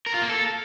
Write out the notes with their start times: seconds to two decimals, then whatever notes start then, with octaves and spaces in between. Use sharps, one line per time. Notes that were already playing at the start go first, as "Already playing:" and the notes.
0.06 A#4
0.14 F4
0.22 A#3
0.29 A4